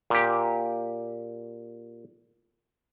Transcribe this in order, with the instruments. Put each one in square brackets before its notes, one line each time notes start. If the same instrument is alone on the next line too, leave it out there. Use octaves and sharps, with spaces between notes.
[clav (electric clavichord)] A#2 G4